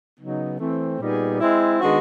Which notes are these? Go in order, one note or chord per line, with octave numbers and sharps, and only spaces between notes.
C#3 F#3 B3 D#4
E3 A3 C4
A#2 G3 B3 D#4 G#4
G#3 C4 E4
D#3 G#3 B3 D4 F#4